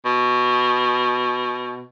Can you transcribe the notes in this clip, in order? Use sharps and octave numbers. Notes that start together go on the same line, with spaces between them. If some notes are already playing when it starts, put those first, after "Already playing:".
B2